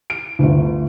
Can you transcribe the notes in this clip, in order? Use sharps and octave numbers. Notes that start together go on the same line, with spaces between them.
D7
G1 D2